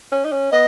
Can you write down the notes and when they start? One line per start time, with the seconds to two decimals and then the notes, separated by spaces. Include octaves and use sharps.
0.12 C#4
0.25 D#4
0.32 C#4
0.51 B3 D#5